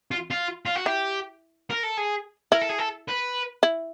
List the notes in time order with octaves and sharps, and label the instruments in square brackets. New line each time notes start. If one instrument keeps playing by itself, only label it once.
[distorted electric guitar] F4
F4
F4
F#4
[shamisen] E4 [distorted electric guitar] G4
[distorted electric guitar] A#4
A4
G#4
[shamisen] E4 [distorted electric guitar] A#4
[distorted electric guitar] A4
G#4
A4
B4
[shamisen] E4